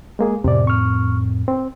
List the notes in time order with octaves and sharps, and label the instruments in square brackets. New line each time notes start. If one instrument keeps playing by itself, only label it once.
[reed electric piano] G#3 A#3 G#4
[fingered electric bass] F2 A2 C4 [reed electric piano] C3 D5
[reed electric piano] C#6 F6
C4